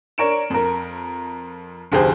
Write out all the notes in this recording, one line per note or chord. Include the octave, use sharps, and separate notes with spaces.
D4 A#4 C#5 D7 E7
F2 A#4
F1 D2 G4 G#4 C5